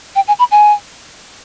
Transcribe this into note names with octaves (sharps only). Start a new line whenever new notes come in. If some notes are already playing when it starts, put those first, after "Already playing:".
G5
G#5
B5
G#5